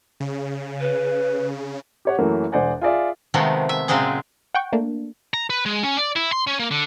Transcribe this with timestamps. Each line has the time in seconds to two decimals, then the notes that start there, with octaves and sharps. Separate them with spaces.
0.20 C#3
0.80 B4
2.05 G4 C#5 F#5
2.19 F#2 E3 F#3 A3 A#3
2.52 E1 G#4 C5 D5 F#5 G#5
2.81 F4 G#4 D5 E5
3.34 C3 D#3 F3 G#3 A3 B3
3.69 E5
3.88 A#2 C#3 F#3 G#3 C4 G#4
4.54 F#5 G5 C#6
4.72 A3 A#3 D4
5.34 A#5
5.50 B4
5.66 G#3
5.83 C#4
5.97 D5
6.16 E4
6.32 C6
6.47 C#4
6.59 A#3
6.71 D3